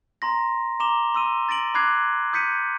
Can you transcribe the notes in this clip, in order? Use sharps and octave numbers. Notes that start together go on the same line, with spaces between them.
A#5 C6 A#6
A#5 C6 D6 E7 F7 G7
C6 E6 D#7
A6 A#6 D7 F#7
B5 D6 F#6 G#6 C7
D#6 G6 B6 C#7 D#7